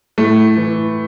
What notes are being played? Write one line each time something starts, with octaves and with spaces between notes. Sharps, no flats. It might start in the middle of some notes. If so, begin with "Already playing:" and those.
A2 A3
E3